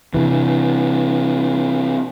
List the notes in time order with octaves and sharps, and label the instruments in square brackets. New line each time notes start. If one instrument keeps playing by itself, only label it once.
[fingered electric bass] C3 E3